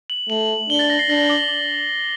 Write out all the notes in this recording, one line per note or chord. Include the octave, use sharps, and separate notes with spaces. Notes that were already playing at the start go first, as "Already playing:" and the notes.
F#7
A3 F#7
D4 G7
A6
A#6
C7
D4 A#6
D6